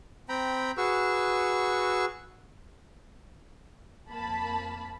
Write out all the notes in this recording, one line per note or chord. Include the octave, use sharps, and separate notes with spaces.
C4 G5 A#5 B5
F#4 G#4 B4 C#6 E6
F2 A#3 A5 B5